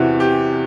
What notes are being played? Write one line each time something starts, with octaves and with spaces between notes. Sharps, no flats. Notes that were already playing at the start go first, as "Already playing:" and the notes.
Already playing: E2 C3 E3 F#4
G4